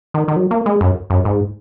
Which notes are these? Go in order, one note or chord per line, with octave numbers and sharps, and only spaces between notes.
D#3
D#3
F#3
A#3
G#3
F#2
F#2
G#2